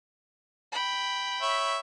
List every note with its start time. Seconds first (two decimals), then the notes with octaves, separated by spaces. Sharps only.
0.72 G5 B5
1.42 C#5 E5